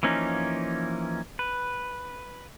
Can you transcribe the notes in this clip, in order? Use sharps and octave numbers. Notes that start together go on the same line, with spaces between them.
E3 F3 A#3 C#4 D#4
B4